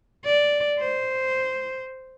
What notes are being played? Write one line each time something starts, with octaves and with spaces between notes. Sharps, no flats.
D5
C5